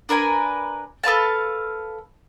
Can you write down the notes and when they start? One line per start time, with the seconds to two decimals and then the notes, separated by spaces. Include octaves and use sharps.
0.09 D4 A#4 B4 G#5
1.03 A4 B4 F5 A5